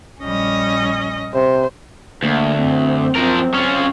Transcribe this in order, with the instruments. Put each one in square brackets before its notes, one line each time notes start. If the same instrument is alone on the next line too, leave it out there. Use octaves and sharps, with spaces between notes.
[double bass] A#1 G3 [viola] C#4 D#5
[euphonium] C3 [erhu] C5
[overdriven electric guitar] D2 [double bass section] A#3
[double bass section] F#2 C4
[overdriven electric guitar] F3 A#4
C#4 F4